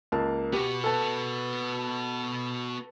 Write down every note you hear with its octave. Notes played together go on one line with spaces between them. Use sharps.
C#2 A#3 A5
B3 F#4 G4
A4 B4 A5